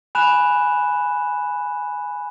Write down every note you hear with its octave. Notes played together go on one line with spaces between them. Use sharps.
G#5 B5 F#6 E7